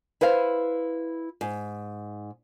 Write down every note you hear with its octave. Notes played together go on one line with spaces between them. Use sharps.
E4 B4 C5 F5
G#2